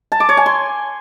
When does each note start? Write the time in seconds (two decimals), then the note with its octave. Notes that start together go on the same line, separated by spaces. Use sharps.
0.12 A5
0.20 D6
0.29 C#5
0.37 G#5
0.46 C6